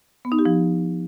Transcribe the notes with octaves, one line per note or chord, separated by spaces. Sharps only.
B3
D#4
G4
F3